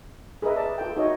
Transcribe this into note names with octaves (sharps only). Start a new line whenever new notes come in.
G#4 A#4 B4 D#5 E5
G#4 D5 A5
F4 A4 G5
D#4 F#4 A#4 C#5 D#5 E5